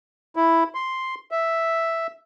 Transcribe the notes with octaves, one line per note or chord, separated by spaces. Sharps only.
E4
C6
E5